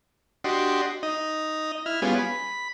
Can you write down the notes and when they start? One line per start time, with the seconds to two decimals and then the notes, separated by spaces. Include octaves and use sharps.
0.44 D4 F#4 G4 D#5 C6
1.03 D#4 D#5
1.86 E4 F6
2.02 G3 B3 C#4 F4 G#4
2.19 B5